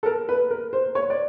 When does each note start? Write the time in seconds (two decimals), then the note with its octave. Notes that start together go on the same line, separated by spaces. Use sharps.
0.03 A4
0.06 A#4
0.29 B4
0.51 A#4
0.73 C5
0.95 C#5
1.10 D5